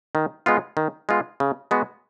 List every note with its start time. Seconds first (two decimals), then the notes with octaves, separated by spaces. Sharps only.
0.15 D#3
0.46 G#3 B3 F4
0.77 D#3
1.09 G#3 B3 F4
1.40 C#3
1.71 G#3 B3 F#4